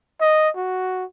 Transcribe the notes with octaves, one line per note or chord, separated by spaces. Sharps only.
D#5
F#4